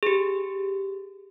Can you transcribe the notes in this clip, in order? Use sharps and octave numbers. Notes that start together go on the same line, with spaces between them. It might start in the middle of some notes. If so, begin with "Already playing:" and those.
G4 G#4